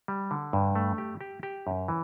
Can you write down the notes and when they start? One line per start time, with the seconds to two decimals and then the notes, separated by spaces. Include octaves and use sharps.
0.08 G3
0.31 D3
0.53 G2
0.75 A3
0.98 G4
1.21 G4
1.43 G4
1.67 F#2
1.88 E3